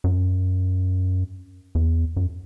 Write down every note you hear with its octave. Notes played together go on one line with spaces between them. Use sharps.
F#2
E2
F#2